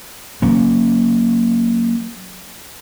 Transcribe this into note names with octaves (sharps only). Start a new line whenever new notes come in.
F#3 A#3 C#4